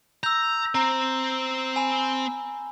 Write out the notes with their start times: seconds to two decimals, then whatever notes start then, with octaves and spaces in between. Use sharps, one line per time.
0.23 A#5 E6 G6
0.75 C4 A#5
1.76 G#5 B5